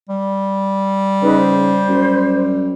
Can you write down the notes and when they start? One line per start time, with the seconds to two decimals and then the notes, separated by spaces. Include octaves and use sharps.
0.09 G3
1.22 C#3 D#4 G#4 B4
1.38 C5
1.88 F#2